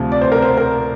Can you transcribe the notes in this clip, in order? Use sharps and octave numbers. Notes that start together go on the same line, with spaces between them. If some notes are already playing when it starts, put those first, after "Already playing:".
Already playing: D2 C3 F3
D5
C5
A#4
C5
A#4